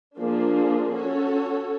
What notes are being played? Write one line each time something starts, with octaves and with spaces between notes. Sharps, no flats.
F3 A#3 D4 F4 G#4
C#4 F#4 A4 C#5